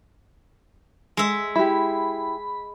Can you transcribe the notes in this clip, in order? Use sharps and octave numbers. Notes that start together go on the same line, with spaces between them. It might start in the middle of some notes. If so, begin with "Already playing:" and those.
G#3 E5
E4 G4 B5